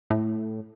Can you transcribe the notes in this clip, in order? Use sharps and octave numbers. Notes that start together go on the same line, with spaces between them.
A2